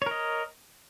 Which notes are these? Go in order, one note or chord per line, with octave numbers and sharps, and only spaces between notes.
A#4 C#5 D#5